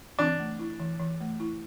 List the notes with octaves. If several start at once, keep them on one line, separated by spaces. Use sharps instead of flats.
E3 D4
A3
E4
E3
E3
A3
E4